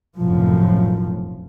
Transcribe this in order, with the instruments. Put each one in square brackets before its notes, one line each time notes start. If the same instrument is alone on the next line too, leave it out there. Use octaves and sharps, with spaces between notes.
[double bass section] F1 B1 F#2 A2 F3